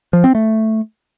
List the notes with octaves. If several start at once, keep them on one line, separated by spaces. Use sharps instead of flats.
F3
C4
A3